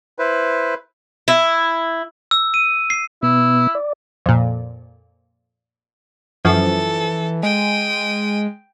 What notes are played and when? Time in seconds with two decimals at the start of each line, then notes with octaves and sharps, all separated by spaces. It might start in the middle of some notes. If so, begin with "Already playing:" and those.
0.19 E4 B4 C5
1.28 E4
2.31 E6
2.54 D#7
2.90 C7
3.23 B2 B3 E4
3.75 D5
4.26 F2 A#2
6.45 F#2 E3 F3 A4
7.43 G#3 G5 D#7